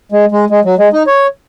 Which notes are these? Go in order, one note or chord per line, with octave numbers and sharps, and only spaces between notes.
G#3
G#3
G#3
F#3
G#3
D#4
C#5